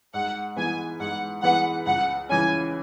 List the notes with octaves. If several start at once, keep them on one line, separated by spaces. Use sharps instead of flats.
G#2 F#5
E3 B3 G#4 B4 G#5
G#2 F#5
E3 B3 G#4 B4 F#5
C#2 F#5
C#3 E3 C#4 G#5